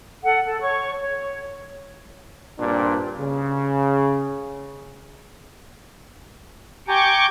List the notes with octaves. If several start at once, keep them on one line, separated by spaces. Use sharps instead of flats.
A4 F#5
A4
C#5 C#6
C#5
G2 A#2 C4 D4
C#3
G4 G#5 A#5 C#6 D6 G6